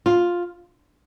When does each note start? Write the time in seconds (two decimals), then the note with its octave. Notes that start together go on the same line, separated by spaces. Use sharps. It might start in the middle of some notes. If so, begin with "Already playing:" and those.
0.06 F4